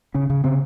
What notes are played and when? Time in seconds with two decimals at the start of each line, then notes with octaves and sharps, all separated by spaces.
0.14 C#3 C#4
0.30 C#3
0.44 C#3 C4